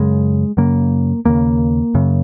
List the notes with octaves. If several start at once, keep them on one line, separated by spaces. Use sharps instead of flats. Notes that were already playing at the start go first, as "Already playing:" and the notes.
Already playing: F#2 C#3 G#3
F#2 C#3 A#3
D#2 C#3 A#3
F#2 C#3